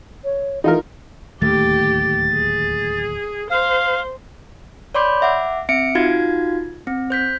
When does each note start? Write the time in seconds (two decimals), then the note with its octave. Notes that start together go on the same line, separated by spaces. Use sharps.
0.24 C#5
0.64 E3 D#4 F4 A#4
1.42 D1 D#2 A3 G4 A6
2.32 G#4
3.50 C5 F5
4.94 C#5 D5 B5 C6 D6 G6
5.22 E5 F#5 D6
5.69 C4 E5 C#7 D7
5.95 D#4 F4 F#4 F5 G#6 A6
6.87 C4
7.10 C5 G6 B6